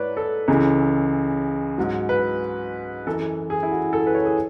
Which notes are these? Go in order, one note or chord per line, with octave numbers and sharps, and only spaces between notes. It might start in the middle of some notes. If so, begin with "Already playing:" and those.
Already playing: G#2 B4 C#5 D5
A4
C#2 C#3 E3
G#2 F#3
B4
F#2 E3 A4
G#4
E4
F#4
A4
B4
C#5
G#4